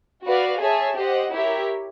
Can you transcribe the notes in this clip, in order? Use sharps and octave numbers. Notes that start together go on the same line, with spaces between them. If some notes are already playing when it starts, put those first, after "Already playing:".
F#4 B4 D5 F5
G#4 C#5 E5 A5
G4 C5 D#5 F#5
E4 G4 A#4 C#5 E5